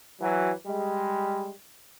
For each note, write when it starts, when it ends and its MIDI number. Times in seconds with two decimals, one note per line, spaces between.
0.21 0.51 52
0.21 0.51 54
0.66 1.51 55
0.66 1.51 56